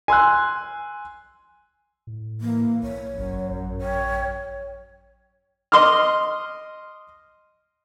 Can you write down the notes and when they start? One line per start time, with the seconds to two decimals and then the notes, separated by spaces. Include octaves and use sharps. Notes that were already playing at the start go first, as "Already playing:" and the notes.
0.08 G#5 C6 E6 F#6
2.07 A2
2.41 E3 A#3
2.83 B1 C#5
3.16 G1 F#2
3.51 A1
3.81 C#5 G5
5.72 D#5 C6 D6 F6